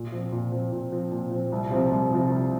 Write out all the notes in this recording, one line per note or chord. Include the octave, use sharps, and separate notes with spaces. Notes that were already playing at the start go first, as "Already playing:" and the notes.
Already playing: A#2
F3 C4
A#2
F3 C4
A#2
F3 C4
A#2
F3 C4
C2
C3 F3 C4 F4
C2
C3 F3 C4 F4
C2